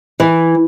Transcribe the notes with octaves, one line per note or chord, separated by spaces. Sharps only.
E3